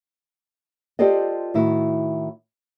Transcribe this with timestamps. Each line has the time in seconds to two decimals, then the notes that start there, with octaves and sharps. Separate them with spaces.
0.99 F4 G4 A4 C5 D5 D#5
1.54 A2 D#3 E4 F#4